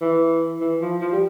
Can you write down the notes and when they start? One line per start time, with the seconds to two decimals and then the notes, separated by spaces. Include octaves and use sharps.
0.01 E3
0.60 E3
0.81 F3
1.01 F3
1.12 G3